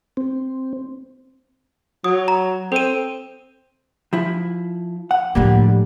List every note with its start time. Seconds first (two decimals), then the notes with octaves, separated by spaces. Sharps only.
0.17 C4
2.04 F#3 D#6
2.28 A#5
2.72 C4 A4 D#7
4.13 F3 E4
5.11 F#5
5.35 A2 D3 F3 G3 A#3